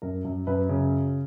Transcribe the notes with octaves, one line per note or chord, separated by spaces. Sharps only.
F#2 A#4
F#2
F#2 B4
C#3